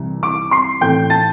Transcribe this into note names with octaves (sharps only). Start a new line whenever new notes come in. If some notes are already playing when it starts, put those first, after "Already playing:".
Already playing: C2 C3 E3 G3
D6 D7
C6 C7
A2 E3 A3 C4 G5 G6
A5 A6